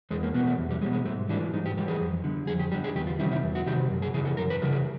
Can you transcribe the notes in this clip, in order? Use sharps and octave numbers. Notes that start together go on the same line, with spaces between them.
E2 G#3
A#3
B2 G3 B3
A3
E2
G3
B2 G3 G#3
G#3
G#2 A3
E3 G3 D4
G#2 D#4
G4
E3 G3 G4
G#4
F2
D3 G3
F2 G#4
G4
D3 G3 G4
G#4
E2 G4
F4
C3 D#3 G3 E4
E4
E2
F#4
C3 D#3 G3 G4
F#2
G#4
C#3 E3 G3 G#4
A4
F#2 A#4
B4
C#3 E3 G3 A#4
G#4